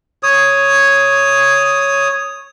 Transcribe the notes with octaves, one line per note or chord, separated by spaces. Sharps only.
C#5 D#6